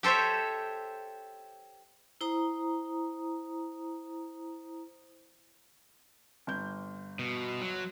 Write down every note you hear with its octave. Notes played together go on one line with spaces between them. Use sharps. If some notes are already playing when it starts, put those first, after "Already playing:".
G4 A4 C5 C#5 E5
E4 C5 A#5 D#6
G1 G6
B2
F#3